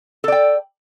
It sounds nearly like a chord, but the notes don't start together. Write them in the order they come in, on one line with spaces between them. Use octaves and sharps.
A4 D5 G5